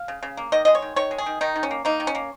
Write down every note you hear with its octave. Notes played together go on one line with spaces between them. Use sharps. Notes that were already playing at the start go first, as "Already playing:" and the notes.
Already playing: F5
C#3
C#3
A#3
D#3 D#5
G#3 D#5
C#5
D#3
D#3 C#5
G#3
G#4
D#3
D#3 D#4
D#3
C#4
A#3
A#3 D#4
D#3
C#4
A#3